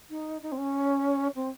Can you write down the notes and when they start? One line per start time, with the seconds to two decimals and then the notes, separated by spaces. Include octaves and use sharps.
0.10 D#4
0.42 D#4
0.52 C4
0.57 C#4
1.35 C4